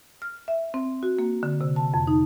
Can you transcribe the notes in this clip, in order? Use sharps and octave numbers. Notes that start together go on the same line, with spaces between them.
F6
E5
C4
F#4
A#3
D3
C3
A5
F2
D#4